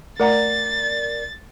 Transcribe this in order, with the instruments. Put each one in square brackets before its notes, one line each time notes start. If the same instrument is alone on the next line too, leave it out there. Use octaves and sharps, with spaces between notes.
[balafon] A3 F#5 A#5 [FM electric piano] A#4 D5 [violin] A6